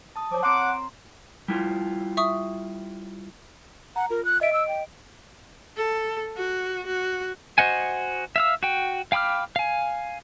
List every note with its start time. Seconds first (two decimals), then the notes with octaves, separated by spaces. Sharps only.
0.16 A5 D#6
0.32 F3 C#5 D6
0.43 C4 F#5 A#5 C6 D6
1.48 G3 E4 F4
2.17 E5 C#6 D#6
3.96 F#5 A#5
4.10 F4 A#4
4.25 F#6
4.41 D#5 E5 D7
4.53 E6
4.68 G5
5.77 A4
6.37 F#4
6.86 F#4
7.58 F#4 C5 D#5 F#5 G#5
8.36 E5 F5 E6
8.63 F#4 G5
9.12 F5 G5 B5 D6 F6
9.56 F5 G#5